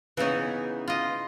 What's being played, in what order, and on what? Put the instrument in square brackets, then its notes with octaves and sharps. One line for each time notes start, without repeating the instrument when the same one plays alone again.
[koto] C#3 D#4 [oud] E3 B3 C#4
[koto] F4 D#5